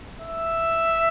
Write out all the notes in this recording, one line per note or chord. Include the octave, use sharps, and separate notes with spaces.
E5